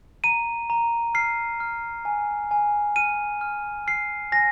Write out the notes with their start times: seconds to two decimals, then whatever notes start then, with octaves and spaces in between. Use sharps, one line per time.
0.24 A#5 D#7
0.70 A#5
1.14 F6 C7
1.60 F6
2.05 G#5
2.51 G#5
2.96 F6 D#7
3.41 F6
3.87 F6 C7
4.32 G#5 A#6